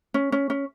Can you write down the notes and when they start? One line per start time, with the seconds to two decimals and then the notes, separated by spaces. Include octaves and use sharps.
0.14 C#4
0.32 C#4
0.50 C#4